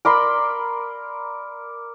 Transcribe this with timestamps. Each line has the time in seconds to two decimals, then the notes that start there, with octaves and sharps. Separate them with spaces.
0.05 A#4 D5 B5 C6